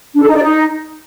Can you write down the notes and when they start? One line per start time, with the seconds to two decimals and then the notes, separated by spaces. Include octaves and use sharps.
0.14 D4
0.21 A4
0.28 D#4
0.35 D5
0.42 D#4